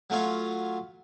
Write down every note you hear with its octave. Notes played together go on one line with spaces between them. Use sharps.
F#3 A3 C#4 F4